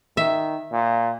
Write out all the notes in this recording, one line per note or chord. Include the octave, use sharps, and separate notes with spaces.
D#3 E5
A#2